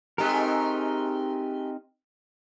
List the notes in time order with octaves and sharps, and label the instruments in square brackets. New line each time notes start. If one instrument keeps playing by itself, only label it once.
[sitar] G#3 A3 G4 [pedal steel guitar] C4 D#4 A#4